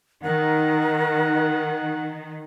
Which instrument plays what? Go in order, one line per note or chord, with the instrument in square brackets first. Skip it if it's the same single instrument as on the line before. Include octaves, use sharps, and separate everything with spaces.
[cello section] D#3 [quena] A#4 [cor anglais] F#5